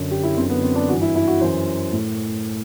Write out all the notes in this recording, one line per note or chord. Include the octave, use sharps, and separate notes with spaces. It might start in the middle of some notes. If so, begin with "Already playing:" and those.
Already playing: F#2 D3
G4
E4
F#2 D3 C4
B3
C4
D4
G2 E3 F#4
E4
E4
F#4
F#2 E3 C5
A2